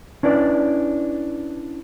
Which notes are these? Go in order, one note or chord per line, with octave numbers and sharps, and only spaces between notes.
C#4 D4 E4 B4 D5